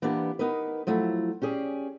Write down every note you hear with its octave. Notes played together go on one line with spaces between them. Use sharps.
E3 A#3 B3 D4 G4
B3 D#4 A#4 B4
F3 F#3 A3 E4
C#4 G4 G#4 D5